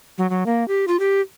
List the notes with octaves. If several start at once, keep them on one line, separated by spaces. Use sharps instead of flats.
F#3
F#3
A#3
G4
F4
G4